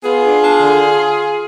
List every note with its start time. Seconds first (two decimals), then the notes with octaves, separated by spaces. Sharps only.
0.04 B3 F4 G#4
0.23 D4
0.43 D4
0.62 D3